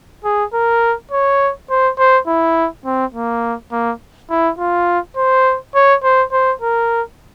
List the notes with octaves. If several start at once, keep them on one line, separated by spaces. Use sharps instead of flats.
G#4
A#4
C#5
C5
C5
E4
C4
A#3
A#3
E4
F4
C5
C#5
C5
C5
A#4